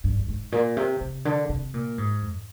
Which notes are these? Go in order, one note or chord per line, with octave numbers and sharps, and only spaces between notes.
G2
G2
G#2
A#2
C3
C3
D3
C3
A#2
G#2
F2